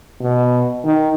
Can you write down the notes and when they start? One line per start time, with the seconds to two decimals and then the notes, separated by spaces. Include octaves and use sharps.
0.21 B2
0.84 D#3